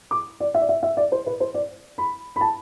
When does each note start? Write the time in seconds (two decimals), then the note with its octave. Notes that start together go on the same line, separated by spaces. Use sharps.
0.11 D6
0.40 D5
0.54 E5
0.61 D5
0.69 E5
0.83 E5
0.97 D5
1.12 C5
1.26 B4
1.40 C5
1.54 D5
1.98 B5
2.36 B5
2.41 A5